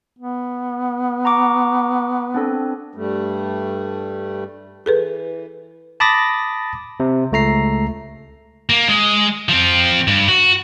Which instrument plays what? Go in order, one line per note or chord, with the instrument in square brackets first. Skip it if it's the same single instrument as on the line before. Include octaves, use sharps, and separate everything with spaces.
[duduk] B3
[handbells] A#5 C#6 D6
C4 D4 A4
[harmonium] G2 G3 A3
[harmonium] E3 [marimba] G#4 A4 B4
[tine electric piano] A5 B5 D6 D#6 A6 A#6
C3
C#2 A3 A#5 C7
[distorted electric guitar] A#3
G#3
F3 C4
G2
F#4